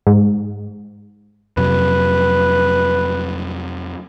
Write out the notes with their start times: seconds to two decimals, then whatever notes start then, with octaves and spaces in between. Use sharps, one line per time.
0.07 G#2
1.57 F2 C3 F#3 B4